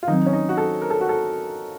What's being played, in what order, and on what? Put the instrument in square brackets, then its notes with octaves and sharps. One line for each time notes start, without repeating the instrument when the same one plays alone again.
[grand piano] F4
[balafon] D#3 F#3 C4 [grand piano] D#4
[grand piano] C#4
D#4
F#4
A4
A#4
A4
F#4
A4